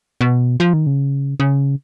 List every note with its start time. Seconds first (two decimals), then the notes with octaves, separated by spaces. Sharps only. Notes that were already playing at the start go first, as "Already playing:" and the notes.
0.21 B2
0.60 F3
0.73 D#3
0.87 C#3
1.40 C#3